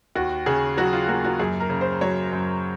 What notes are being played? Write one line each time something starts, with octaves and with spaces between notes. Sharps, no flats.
D#2 F#4
C#3 G#4
F#3 F#4
F4
A#3 F#4
F#4
F#2 G#4
A#4
C#3
C5
F#3 C#5
F#2